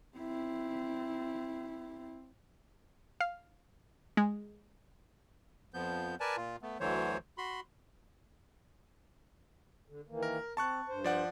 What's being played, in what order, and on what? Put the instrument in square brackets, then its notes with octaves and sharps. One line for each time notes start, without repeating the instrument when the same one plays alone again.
[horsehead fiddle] C4 E4
[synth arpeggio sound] F5
G#3
[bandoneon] F2 F3 B3 G6
A#4 B4 D5 G#5 A5
A#2 F4
A3 B3
D2 D3 E3 F#3 C5 C#5
F#4 B5 C6
[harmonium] D3
D#3 E3 A#3
[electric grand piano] A#4
[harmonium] C4 [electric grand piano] A5 C#6 F#6
[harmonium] G2 C5
[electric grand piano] F3 D5 F#5